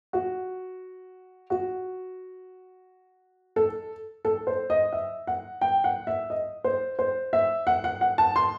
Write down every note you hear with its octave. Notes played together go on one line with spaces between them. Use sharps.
F#4
F#4
A4
A4
C5
D#5
E5
F#5
G5
F#5
E5
D#5
C5
C5
E5
F#5
F#5
F#5
A5
C6